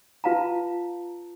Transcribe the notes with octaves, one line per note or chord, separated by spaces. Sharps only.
F4 B4 F5 A5 A#5